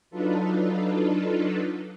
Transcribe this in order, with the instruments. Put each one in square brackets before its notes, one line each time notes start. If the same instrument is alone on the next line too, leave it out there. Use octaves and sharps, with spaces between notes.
[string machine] F#3 D4 D#4 F4 A4 B4